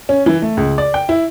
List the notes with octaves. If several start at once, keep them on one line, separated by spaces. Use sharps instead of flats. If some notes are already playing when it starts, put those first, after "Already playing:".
C#4
E3
A3
C#2
D5
G5
E4